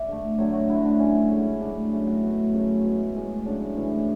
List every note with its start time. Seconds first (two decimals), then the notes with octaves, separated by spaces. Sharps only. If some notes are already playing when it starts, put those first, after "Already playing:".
Already playing: D5 E5
0.08 D3 A3
0.38 D3 F#3 A3 C#5
0.54 F#4
0.70 D3 A3 E4
0.85 D4
1.00 D3 F#3 A3 C#4
1.31 C#3 G#3
1.61 D3 F#3 A3 D4
1.92 C#3 F#3 A3 E4
2.07 F#4
2.23 B2 A3
2.53 C#3 F#3 A3 C#4
2.85 B2 G#3
3.15 A2 G#3
3.45 C#3 F#3 A3 D4
3.76 A2 E3 A3